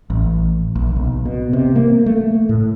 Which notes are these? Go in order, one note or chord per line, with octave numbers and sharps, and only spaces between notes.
A1
A#1
B1
B2
C3
A#3
A3
A2